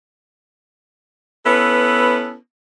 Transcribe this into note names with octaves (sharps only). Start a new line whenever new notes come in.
B3 C#4 E4 A4 B4